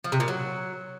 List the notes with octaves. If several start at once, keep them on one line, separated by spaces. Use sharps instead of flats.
F3
C3
A#2
F#3